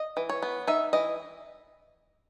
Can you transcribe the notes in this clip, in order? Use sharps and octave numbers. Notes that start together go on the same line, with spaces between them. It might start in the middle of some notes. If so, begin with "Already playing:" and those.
Already playing: D#5
E3
C#5
B3
D#4 E5
E3 D#5